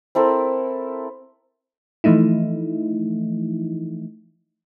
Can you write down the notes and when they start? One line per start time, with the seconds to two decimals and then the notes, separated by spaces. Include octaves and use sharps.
0.15 C4 E4 A4 A#4
2.04 E3 F3 A3 D#4 E4